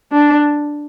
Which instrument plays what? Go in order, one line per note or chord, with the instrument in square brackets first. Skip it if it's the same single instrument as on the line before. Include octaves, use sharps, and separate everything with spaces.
[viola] D4